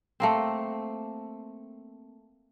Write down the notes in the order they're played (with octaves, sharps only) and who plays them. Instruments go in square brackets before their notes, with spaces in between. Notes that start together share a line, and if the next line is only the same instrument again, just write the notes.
[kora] A3 A#3 C4